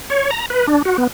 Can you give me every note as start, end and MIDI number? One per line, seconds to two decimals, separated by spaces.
0.10 0.30 73
0.31 0.46 82
0.50 0.66 71
0.67 0.82 62
0.85 0.97 66
0.98 1.07 59